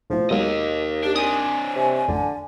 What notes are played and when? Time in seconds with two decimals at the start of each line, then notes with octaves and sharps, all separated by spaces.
0.10 B1 A2 F3
0.30 D#2 B2 F#3 G#3 D#5 F5
1.03 D4 G4
1.16 C4 D4 G#5 D#6
1.76 C3
2.08 A1 F2 D3